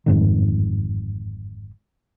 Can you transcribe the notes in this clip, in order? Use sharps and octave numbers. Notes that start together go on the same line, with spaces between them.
G1 F2 G#2 D#3